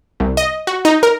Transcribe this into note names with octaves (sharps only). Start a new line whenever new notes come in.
C2
D#5
F#4
D#4
A#4